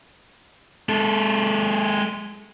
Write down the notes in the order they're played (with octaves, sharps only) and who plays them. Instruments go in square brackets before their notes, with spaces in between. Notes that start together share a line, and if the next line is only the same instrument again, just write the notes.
[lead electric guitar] G#3 A4